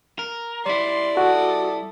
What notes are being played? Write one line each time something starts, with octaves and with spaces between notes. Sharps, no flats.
A#4
G3 E4 D5 C6
F#4 A4 D#6